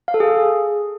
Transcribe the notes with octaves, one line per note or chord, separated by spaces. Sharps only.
F5
A4
G#4